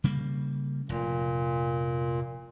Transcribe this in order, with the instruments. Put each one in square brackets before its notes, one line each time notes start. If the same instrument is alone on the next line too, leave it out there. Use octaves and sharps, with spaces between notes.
[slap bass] C#3 G3 A#3
[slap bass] F1 [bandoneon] A#2